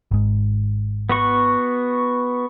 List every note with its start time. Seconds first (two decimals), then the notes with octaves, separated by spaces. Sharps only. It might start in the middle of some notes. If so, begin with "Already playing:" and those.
0.11 G#1 G#2
1.09 B3 F#4 C#6